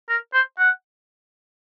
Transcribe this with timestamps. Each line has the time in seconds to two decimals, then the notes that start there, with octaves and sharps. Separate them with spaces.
0.09 A#4
0.33 C5
0.59 F#5